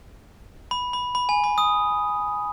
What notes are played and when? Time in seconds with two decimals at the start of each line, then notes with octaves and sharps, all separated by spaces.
0.71 B5
0.93 B5
1.15 B5
1.29 G#5
1.44 B5
1.58 D#6